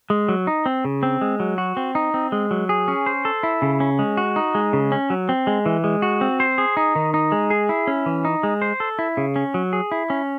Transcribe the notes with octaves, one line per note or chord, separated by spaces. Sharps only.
G#3
F#3
D#4
C4
C#3
C4
G#3
F#3
F#4
C4
D#4
C4
G#3
F#3
G#4
C#4
C5
A4
E4
C#3
C#4
G#3
F#4
D#4
G#3
C#3
C#4
F#3
C4
G#3
E3
G#3
F#4
C4
C5
G#4
D#4
D#3
D#4
G#3
G#4
E4
C#4
E3
D#4
G#3
C5
A4
E4
C#3
C#4
F#3
G#4
E4
C#4